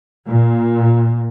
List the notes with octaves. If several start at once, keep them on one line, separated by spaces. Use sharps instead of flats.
A#2